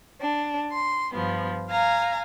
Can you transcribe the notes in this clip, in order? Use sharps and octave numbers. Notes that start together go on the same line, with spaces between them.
D4
C6
G2 F3 B3
F5 G#5 A#5